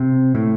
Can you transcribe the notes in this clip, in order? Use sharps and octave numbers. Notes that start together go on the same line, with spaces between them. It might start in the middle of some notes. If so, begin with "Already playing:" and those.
Already playing: C3
A2